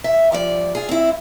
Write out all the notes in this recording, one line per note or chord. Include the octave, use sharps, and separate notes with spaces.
E5
G2 F3 D5
F4 G#4
C4 E4